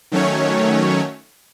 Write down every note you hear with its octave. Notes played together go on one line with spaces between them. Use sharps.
D#3 F#3 A3 C#4 C#5